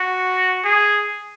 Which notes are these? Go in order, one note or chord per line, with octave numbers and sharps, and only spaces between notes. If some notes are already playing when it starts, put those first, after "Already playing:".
Already playing: F#4
G#4